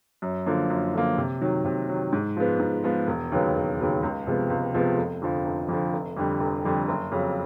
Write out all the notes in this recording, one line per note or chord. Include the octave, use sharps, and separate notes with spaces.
F#2
D3 F3 A#3
F#2
D3 F3 A#3
C3
D#3 F#3
C3
D#3 F#3
G#2
F3 G#3 B3
G#2
F3 G#3 B3
E1
D#2 C#3 F#3 B3
E1
D#2 C#3 F#3 B3
C#2
C3 F3 G#3 B3
C#2
C3 F3 G#3 B3
F1
F2 D3 F3
F1
F2 D3 F3
F1
F2 D3 G3
F1
F2 D3 G3
F#1
F2 C#3 F#3